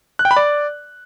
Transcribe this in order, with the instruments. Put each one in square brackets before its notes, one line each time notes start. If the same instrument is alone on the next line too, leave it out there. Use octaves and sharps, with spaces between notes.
[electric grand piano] F#6
G5
B5
D5